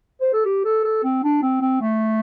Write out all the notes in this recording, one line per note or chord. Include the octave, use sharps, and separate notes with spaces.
C5
A4
G4
A4
A4
C4
D4
C4
C4
A3